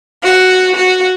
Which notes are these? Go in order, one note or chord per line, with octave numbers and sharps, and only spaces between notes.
F#4
F#4